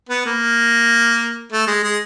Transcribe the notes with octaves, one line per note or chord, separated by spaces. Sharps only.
B3
A#3
A3
G#3
G#3